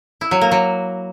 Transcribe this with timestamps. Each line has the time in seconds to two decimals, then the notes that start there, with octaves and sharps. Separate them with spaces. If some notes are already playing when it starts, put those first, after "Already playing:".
0.21 E4
0.31 F#3
0.41 A#3
0.52 F#3